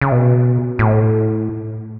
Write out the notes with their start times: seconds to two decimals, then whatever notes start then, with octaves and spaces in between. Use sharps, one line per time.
0.01 C#3
0.12 B2
0.79 A2